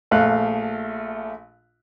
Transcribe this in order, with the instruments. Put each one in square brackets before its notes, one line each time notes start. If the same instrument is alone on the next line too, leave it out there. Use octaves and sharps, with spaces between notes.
[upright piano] A#1 A3 F5 F#6